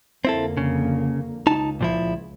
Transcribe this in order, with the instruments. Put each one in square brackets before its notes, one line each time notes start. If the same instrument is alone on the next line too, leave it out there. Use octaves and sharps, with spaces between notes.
[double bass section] F2 D3 A#3 [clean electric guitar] C4 E4 A4
[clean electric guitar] C#3
[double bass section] C#2 [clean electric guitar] D#4 A5
[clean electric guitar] A#2 F3 E4